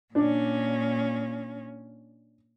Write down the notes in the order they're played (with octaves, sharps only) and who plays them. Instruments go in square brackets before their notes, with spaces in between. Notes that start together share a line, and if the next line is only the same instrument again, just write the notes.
[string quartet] A#2 C#4 [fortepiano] D4 D5